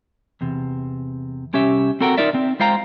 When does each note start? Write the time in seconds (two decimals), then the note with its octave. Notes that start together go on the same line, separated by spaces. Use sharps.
0.41 E2 C3
1.53 C2 C#4 G4 E5
2.01 C4 F#4 A4 A#4 F#5 G5
2.18 D#4 F4 A#4 D5 E5
2.35 C4
2.60 G#3 F4 C5 F5 G5 A#5